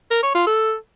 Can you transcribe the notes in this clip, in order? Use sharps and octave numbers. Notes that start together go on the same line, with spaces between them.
A#4
C#5
F4
A4